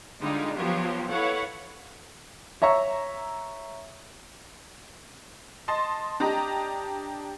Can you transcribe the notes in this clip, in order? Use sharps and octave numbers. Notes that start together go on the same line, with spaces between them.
D3 G3 G#3 D#4 F4
F3 F#3 B3 F4 G4
E4 A4 B4 C#5 F5 F#5
C#5 E5 A#5 C#6
D#5 A5 C6
D4 G4 D#5 A#5